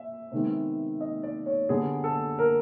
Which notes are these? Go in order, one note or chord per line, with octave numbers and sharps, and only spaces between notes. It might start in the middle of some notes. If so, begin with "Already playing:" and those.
Already playing: E5
C3 D#3 G#3 B3
D#5
D5
C#5
D3 G3 B3 G#4
A4
A#4